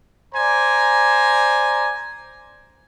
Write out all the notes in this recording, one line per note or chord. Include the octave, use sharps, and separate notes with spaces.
C5 D5 G#5 A#5